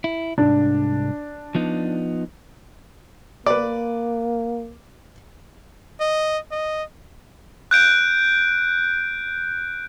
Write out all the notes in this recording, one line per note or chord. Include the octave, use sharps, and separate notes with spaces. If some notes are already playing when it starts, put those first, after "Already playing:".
E4
C2 G#2 D4
F3 B3 D#4
A#3 B4 D5
D#5
D#5
F#6 G6 D7